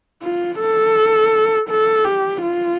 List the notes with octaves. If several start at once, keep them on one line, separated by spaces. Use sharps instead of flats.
F4
A4
A4
G4
F4